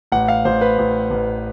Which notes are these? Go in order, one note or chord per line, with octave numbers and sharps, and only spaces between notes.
A1 F#5
F5
A1 C5
B4
A1
A1